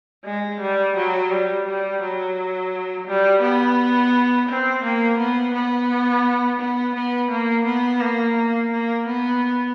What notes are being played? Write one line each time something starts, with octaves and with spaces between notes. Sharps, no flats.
G#3
G3
F#3
G3
G3
F#3
G3
B3
C4
A#3
B3
B3
B3
B3
A#3
B3
A#3
A#3
A#3
B3